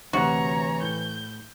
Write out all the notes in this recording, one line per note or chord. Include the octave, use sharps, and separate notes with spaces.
D2 C3 E3 F#4 C#5 A#5
A2 G6